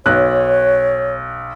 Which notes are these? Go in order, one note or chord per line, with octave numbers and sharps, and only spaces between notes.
B1 C#5 F#6